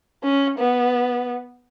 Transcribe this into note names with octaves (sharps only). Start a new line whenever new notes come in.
C#4
B3